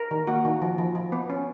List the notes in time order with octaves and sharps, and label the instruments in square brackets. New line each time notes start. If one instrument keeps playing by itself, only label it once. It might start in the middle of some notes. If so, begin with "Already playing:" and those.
Already playing: [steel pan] A#4
D#3
A#3 F#4
D#3
F3
F3
F3
B3
C#4